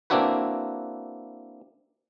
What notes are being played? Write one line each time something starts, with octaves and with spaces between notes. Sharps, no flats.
A#3 C4 D4 E4 F#4 B4